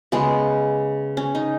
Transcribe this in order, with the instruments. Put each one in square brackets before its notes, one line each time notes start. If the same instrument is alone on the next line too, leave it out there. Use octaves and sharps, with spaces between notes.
[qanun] C#3 G#3 B3
C#4
D#4